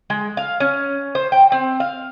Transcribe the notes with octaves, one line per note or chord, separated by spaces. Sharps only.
G#3
F5
C#4
C5
G5
C4
F5